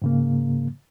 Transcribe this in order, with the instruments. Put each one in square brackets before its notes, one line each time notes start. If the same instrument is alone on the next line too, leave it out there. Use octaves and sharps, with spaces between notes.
[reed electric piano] G#2 C#3 A#3